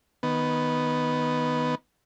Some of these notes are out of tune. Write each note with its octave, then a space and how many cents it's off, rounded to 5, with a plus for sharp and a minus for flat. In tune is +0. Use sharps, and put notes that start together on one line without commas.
D#3 +0 B3 +0